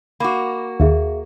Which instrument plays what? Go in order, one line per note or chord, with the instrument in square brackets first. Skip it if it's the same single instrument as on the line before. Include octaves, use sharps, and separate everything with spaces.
[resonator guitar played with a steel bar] A#3 F#4 [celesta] B5 D6
[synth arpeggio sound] D#2 [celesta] G#4 E5 F5